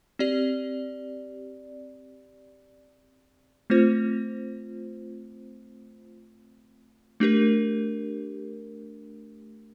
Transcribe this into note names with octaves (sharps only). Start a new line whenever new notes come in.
C4 G4 D5
A3 C4 F4 C5
A3 D4 G4 A#4